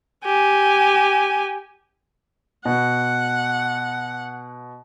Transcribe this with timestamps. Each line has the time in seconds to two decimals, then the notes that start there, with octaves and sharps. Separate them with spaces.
0.24 G4 G#5
2.65 B2 F#5